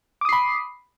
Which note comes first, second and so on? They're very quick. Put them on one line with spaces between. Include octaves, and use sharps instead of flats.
D6 D#6 C7 B5